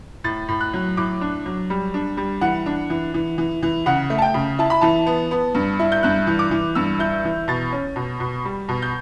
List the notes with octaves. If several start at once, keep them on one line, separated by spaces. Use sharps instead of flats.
A2 A6
A2
F#6
F#3
A2 D6
D4
F#3
G3
D4
G3
E3 F#5
D4
E3
E3
E3
E3
C#3 F#5
A3
A5
G5
C#3
E4 A5
B5
E3 A5
B3
B3
G2
E4
G6
G2 F#6
E3
D6
E3
G2 E6
E4 G6
E3
B2 A6
C#4
B2
B2
G3
B2
G6